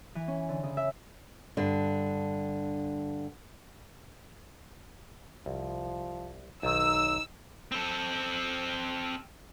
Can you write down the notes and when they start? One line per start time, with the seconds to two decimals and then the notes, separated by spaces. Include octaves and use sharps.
0.15 E3
0.28 C#4
0.49 D3
0.63 C#3
0.77 E5
1.57 G2 D3
5.46 C2 F3
6.63 B1 D#3 D#4 E6
7.72 C4 A4